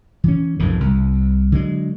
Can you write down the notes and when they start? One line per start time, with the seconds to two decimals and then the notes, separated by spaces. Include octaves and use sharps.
0.24 E3 C#4
0.59 B1 F2 G#2 D#3
0.80 C2
1.52 D3 F#3 G#3